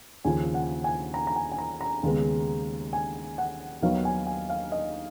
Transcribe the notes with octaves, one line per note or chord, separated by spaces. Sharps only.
D#2 C#3 F3 G#5
F#5
G#5
A#5
A#5
G#5
G#5
A#5
A#5
D#2 C#3 G#3 B3
G#5
F#5
D#2 D#3 F#3 B3 F5
G#5
G#5
F5
D#5